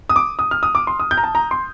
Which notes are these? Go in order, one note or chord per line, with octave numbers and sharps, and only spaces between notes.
D#6
D6
D#6
F6
D#6
D6
C6
D#6
G6
A#5
A5
A#5
C6